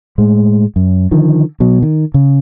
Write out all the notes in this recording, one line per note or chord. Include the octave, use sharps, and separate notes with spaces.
A2 G#3
F#2
D3 D#3 F3
B2 F#3
D#3
C#3